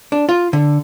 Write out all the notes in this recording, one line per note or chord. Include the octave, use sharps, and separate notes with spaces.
D4
F4
D3